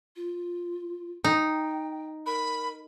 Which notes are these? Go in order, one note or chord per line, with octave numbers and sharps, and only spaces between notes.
F4
D#4 G5
A#4 B5